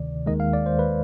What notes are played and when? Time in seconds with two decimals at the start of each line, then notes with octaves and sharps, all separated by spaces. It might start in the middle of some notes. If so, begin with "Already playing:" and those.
Already playing: D2 C3 D#3 D5
0.26 D#2 D#3 G#3 D#5
0.40 F5
0.53 D5
0.66 C5
0.79 B4